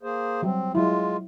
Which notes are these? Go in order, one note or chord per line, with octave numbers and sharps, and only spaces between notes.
A#3 G#4 C5
F#3 G3 C4
F#3 G#3 E4 F4